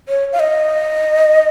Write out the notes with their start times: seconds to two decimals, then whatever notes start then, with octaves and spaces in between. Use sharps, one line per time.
0.08 C#5
0.33 F5
0.40 D#5